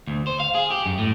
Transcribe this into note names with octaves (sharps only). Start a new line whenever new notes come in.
D2
C5
F5
G#4
G4
F#2
A2